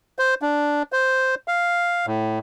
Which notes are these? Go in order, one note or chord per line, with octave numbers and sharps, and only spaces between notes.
C5
D4
C5
F5
A2